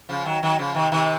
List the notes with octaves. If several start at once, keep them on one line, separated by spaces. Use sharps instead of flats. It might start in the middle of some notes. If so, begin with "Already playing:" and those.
C#3 F3
D#3 F#3
D#3 F#3
C#3 F3
C3 D#3
C3 D#3